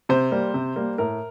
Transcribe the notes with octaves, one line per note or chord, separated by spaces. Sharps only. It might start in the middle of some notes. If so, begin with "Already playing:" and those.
C3 C5
G3 A#3
C3
G3 A#3
A2 A#4